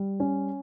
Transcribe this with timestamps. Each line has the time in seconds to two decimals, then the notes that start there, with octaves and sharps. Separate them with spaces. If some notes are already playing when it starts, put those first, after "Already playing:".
Already playing: G3
0.20 C#4